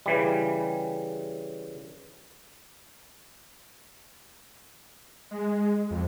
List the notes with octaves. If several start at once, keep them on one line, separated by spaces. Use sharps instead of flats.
C#3 E3 G3
G#3
F2